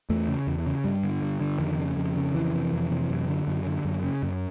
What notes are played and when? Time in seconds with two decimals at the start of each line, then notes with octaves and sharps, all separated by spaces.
0.10 E2 A3
0.28 C#3
0.47 E2
0.66 C#3
0.84 G2 G3
1.03 D3
1.22 G2
1.40 D3
1.59 F2 D#3
1.78 C#3
1.97 F2
2.16 C#3
2.34 F2 E3
2.53 C3
2.72 F2
2.91 C3
3.10 F#2
3.28 D3
3.47 F#2
3.66 D3
3.85 F#2
4.03 C#3
4.23 F#2